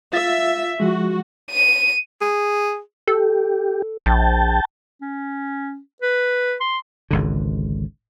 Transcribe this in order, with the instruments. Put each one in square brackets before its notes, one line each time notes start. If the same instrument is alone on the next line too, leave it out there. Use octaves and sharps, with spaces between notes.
[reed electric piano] F4 F5 A6 [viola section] E5
[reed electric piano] F3 G#3 [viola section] F#4
[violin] D#7
[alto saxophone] G#4
[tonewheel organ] G4 [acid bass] A4
[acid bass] A#1 [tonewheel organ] G5 A5
[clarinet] C#4
B4
C6
[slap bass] G#1 C#2 D3